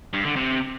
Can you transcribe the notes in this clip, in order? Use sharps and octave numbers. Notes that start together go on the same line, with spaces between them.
G2
D3
C3